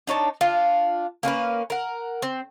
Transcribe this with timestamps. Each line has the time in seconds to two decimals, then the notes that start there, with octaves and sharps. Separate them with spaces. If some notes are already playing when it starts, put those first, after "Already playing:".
0.07 D4 D#4 C#5 A5
0.41 D4 F4
1.23 A#3 C#4 F#4 B4
1.70 A#4 F#5
2.22 C4